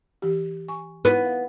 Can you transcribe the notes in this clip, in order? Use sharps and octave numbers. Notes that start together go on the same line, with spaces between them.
E3 G4
G#5 C#6
B3 D#4 E4
F5